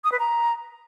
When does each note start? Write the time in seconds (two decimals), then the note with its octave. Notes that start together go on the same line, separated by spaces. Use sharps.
0.04 D#6
0.12 B4
0.19 A#5